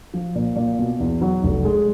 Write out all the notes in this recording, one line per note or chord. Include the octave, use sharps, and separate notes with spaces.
F3
A#2
A#2
B2
E2
F#3
F1
G#3